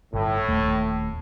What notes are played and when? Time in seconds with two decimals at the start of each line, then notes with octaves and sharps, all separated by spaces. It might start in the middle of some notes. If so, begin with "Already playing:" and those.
0.13 G1 A2
0.48 D#1 A3